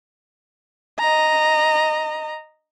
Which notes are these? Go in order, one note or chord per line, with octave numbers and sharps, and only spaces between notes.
D#5 A#5